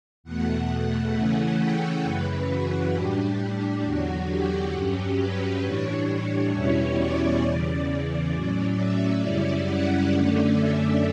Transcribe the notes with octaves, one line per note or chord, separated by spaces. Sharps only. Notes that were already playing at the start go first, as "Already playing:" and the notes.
E2 B2 A3 F#5
F#5
C#3 E3 A3 C#4
G5
F#2 C#3 E3 B4
F#4
A2 G3 D4 G4
E2 D3 F#3 F#4
G4
G2 F#3 C#4 G4
B4
A2 E3 G3 D4 C#5
E2 B2 G3 C#4 E4
D5
E2 C#3 E3 D5
D5
A2 F#3 C#4 D5
E5
F#2 C#3 G3 C#4 E4 D5
F#5
F#2 D3 A3 C#4 D5
E5